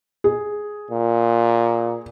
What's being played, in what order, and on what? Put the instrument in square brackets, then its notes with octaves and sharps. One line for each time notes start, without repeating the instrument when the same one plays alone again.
[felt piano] G#4
[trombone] A#2